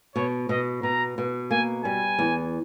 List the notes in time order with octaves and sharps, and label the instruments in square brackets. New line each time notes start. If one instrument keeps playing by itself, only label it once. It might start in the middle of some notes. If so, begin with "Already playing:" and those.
[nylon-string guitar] B2 [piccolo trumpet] C#5
[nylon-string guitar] B2 [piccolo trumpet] D#5
[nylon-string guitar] B2 [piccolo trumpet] A#5
[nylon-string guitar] B2
[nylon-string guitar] A#3 [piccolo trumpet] G#5
[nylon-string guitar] G3 [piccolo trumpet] G#5
[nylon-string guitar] E2